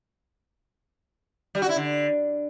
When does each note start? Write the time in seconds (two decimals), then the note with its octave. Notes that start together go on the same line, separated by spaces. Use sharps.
1.55 G3
1.62 F#4
1.69 E4
1.76 D3